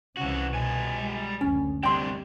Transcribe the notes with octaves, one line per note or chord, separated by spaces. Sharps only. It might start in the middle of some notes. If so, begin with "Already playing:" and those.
C2 C#3 E3 F#4
B2 G3 G#5
G#3
F#1 D2 C#4
C3 G3 D4 G5 C6